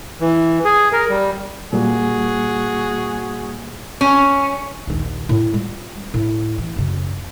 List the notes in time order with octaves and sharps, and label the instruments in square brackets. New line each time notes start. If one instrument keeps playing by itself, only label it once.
[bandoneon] E3
G#4
A#4
G3
[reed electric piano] A#2 G3 A#3 [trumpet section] F#4 G#4
[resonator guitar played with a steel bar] C#4
[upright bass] A#1 D#2
A2
G3 F4
A2
E3
F#2 C#3